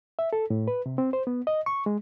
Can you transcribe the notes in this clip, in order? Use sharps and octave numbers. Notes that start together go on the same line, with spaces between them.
E5
A4
A2
B4
C3
C4
C5
B3
D#5
C#6
G#3